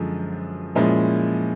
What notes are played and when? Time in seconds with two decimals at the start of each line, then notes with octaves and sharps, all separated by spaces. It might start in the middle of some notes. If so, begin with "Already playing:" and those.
Already playing: F#2 D3 F3 G#3
0.75 A#2 F3 G#3 C#4 E4